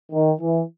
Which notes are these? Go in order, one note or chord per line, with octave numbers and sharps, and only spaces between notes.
D#3
E3